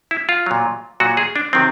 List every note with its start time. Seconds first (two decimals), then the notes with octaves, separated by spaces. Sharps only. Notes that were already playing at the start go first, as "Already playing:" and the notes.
0.11 E4
0.29 F4
0.46 A#2 F#3
1.00 A#2 F#3 F#4
1.17 G#4
1.36 D4
1.53 C3 D#3 F#3 C4